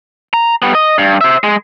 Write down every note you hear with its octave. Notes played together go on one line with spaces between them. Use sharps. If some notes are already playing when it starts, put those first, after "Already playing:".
A#5
G3 B3
D#5
G2
C5 E5
G#3